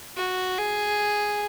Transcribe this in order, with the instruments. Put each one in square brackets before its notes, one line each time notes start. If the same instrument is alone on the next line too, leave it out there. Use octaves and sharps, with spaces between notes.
[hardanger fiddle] F#4
G#4